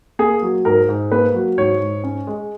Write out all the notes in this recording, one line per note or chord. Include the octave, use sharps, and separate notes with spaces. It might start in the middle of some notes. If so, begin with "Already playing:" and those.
A#3 G#4
F#3
G#2 A#4
G#2
A#3 B4
F#3
G#2 C#5
G#2
C#4
G#3